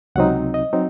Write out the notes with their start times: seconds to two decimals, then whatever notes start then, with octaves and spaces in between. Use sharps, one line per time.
0.16 C#2 C3 F#3 C4 D#4 F#5
0.54 D#5
0.73 F#3 C4 D#4